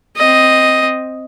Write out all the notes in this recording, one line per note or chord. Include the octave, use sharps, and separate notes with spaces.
C4 D#5